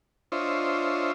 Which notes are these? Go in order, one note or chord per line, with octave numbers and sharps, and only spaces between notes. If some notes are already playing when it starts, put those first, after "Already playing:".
D4 F4 C5 C#5 D#5 E5